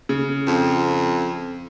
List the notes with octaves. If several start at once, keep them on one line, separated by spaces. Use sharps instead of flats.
C#3
F2